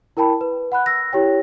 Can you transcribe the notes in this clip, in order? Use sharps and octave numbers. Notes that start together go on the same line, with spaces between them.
E4 A#4 G5 A5 B5
B4
F#5 B5 F#6
E6 A#6
E4 G4 C#5 G5